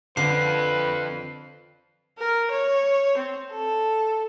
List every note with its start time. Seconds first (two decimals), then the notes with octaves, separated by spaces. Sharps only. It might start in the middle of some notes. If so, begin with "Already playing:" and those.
0.17 D3 C4 F4 B4 C7
2.18 A#4
2.51 C#5
3.18 C4
3.51 A4